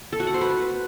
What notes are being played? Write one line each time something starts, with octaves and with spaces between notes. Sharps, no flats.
A4
F#4
F#5
C5
B4